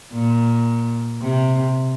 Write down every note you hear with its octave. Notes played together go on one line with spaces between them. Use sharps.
A#2
C3